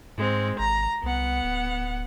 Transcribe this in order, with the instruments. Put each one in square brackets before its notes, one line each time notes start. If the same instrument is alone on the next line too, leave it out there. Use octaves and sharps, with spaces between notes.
[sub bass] G#2 [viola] G#3 C4
[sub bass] G#1 [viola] A#5
[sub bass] C2 [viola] B3 F#5
[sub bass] D1